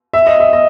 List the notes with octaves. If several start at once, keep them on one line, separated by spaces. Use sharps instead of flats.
E5
D#5
E5
D#5